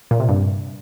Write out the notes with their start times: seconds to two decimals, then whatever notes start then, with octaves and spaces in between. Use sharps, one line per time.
0.11 A#2
0.20 C3
0.29 G2